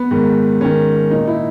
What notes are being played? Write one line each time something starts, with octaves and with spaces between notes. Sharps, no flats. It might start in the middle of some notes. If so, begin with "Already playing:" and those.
Already playing: B3
G#2 D#3
G#2 D#3 C#4
A#2 D#4
E4